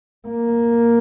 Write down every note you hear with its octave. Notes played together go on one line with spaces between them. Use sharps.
A#3